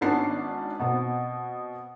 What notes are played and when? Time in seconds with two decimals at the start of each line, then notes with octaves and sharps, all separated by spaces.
0.01 G#1 G#2 B3 C#4 D4 C7
0.79 B2 B3 C4